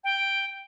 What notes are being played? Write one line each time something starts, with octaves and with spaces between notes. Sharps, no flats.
G5